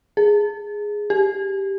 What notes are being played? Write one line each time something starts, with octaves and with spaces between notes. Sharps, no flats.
G#4
G4